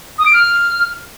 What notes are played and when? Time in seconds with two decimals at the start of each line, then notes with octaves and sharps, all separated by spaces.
0.18 D#6
0.26 D7
0.33 F6